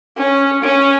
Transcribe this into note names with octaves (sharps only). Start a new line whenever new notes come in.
C#4
C#4